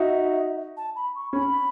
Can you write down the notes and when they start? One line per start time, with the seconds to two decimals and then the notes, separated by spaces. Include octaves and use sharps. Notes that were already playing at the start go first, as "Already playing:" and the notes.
Already playing: D#4 F#4 E5
0.77 A5
0.96 B5
1.15 C#6
1.33 C#4 B5